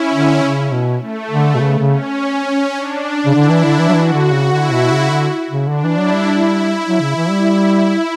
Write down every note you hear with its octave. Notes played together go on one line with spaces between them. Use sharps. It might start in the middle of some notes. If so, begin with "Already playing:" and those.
Already playing: C#4 E4
D3
C#3
B2
A3
D3
B2
C#3 B3
C#3
C#4
D4
C#3
D3 E4
E3
D3
E3
F#3
E3 F#4
D3
C#3
D3 E4
B2
C#3
D3
C#3
D3 D4
E3
F#3 E4
G3
E4
F#3
C#3
E3
G3